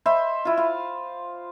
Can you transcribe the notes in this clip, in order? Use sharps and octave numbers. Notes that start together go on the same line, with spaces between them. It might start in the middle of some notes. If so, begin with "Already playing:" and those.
C5 D#5 E5 B5
E4 F4
F5